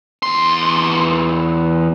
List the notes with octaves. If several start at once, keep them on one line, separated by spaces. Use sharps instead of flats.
E2 C6